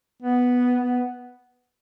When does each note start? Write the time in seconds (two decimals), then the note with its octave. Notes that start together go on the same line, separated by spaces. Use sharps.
0.22 B3
0.81 B3